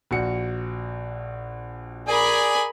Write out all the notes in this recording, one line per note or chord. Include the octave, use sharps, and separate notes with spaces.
A#1 F#4 C#7
G#4 A#4 D5 G#5 B5